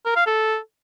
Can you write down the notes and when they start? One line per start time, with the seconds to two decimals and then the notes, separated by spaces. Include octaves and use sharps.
0.06 A#4
0.16 F5
0.27 A4